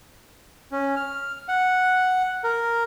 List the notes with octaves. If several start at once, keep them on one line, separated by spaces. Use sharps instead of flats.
C#4
F6
F#5
A#4